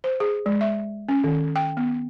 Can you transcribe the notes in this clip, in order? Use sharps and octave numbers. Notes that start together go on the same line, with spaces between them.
C5
G#4
G#3
E5
C#4
D#3
G5
B3